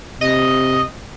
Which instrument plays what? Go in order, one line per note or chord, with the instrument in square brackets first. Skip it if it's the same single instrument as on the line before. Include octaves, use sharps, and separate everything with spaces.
[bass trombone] C3 [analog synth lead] D#5